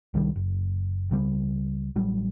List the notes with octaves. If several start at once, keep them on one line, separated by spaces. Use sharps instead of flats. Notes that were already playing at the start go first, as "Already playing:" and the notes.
C2 D#3 E3 G3
F#1
C#2 C#3 G3
A1 F#3 G3